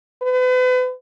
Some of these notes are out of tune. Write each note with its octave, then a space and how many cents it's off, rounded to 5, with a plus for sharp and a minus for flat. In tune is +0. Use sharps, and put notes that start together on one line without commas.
B4 +40